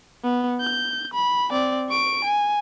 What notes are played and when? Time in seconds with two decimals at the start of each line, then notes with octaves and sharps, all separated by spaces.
0.24 B3
0.60 G6
1.13 B5
1.51 C4 D5
1.89 C#6 D7
2.25 G#5